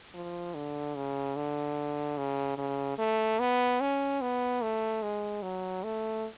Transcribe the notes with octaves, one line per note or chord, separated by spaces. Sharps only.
F3
D3
C#3
D3
C#3
C#3
A3
B3
C#4
B3
A3
G#3
F#3
A3